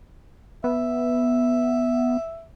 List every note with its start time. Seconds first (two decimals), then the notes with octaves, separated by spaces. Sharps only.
0.64 B3 E5